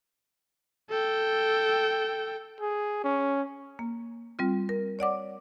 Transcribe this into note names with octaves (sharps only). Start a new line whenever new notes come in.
A4 G5
G#4
C#4
A#3
G3 C4 F4
A#4
C#5 D5 F#5 D6